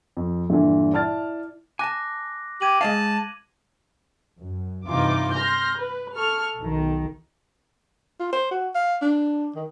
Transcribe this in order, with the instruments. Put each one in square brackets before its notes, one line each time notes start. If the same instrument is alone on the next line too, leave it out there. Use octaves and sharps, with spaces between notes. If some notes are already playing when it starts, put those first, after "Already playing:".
[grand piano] F2
G2 A#2 D3 E3
E4 D5 A5 F6 A6
[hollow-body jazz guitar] G#5 A5 [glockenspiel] D6 F#6 A#6
[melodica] G4 [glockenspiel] G#6 D#7 F#7
[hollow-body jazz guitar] G#3 D#5 F5 [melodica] A5
[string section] F#2
G2 C3 E3 D#4 F4 D6
C6 F6 G6 A#6
B4
A4 C#6 F6
B1 D#3
[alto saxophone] F4
C5
F#4
F5
D4
D#3